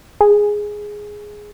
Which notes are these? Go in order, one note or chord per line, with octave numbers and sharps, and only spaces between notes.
G#4